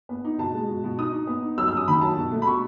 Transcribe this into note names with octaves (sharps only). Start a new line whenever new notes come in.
B3
D#4
B2 A5
G#3
B2
B2
D#4 D#6
D#4
B3
D#4
F#3 E6
E6
F#2 D#6
D#3 B5
F#3 A5
B2
A3
B5
B2 C#6